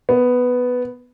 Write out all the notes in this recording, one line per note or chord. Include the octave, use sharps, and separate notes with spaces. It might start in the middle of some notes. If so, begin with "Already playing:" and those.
B3